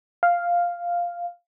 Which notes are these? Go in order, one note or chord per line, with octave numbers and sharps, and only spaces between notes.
F5